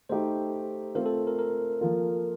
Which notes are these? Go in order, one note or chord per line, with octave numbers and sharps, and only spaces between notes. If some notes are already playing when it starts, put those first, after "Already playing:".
A3 D#4 G4 C5
A3 C4 F4 A#4 C5
A4
A#4
A#4
F3 A#3 F4